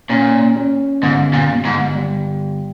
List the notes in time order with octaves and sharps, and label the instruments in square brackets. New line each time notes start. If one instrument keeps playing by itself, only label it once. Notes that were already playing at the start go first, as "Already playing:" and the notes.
[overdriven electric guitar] A#2 [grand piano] C#4
[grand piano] C#4
[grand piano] G1 [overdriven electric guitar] G#2
[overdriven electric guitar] A#2
[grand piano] G1
[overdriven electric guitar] G#2
[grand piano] G3